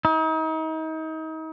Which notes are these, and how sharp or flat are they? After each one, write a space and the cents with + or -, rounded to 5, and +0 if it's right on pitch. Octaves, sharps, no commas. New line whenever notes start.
D#4 +35